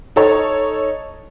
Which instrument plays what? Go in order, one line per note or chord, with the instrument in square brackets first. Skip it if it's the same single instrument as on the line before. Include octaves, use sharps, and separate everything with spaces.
[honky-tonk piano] D#4 A4 C#5